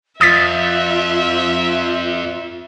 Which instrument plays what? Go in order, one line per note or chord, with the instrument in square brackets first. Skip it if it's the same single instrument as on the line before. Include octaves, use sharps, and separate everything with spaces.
[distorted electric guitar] F2 [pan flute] F4 [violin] E5 [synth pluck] D#6 A6 B6